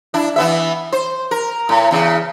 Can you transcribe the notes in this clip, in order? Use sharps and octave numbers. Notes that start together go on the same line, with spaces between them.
D4 E4
E3 B3 E5
C5
A#4
A2
E2 C#3